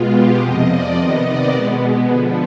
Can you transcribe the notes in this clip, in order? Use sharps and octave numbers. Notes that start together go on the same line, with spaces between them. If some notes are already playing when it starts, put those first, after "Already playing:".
Already playing: B2 G#3 B3 F4
G4
F2 C3 F3 D#5
D5
C3 D#3 B3 D#5
D5
B2 G#3 B3
D3 F3 B3